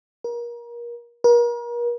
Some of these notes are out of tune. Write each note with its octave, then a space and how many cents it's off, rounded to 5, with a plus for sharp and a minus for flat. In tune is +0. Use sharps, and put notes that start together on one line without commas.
A#4 +30
A#4 +40